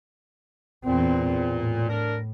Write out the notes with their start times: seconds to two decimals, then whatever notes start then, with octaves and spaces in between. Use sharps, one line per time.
0.86 E2 A#2 C4
1.53 A2
1.89 D4 A#4